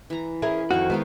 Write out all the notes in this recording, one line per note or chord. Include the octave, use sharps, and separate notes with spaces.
E3 A#5
C#4 E4 G#4 A#4
F2 D#3 E4 F#4 F5 C#6
D#3 G#3 B3 E4 F5 G5